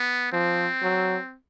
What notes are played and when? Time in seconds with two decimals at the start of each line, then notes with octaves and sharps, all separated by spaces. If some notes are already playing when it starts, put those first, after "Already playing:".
Already playing: B3
0.32 F3 C4
0.83 F#3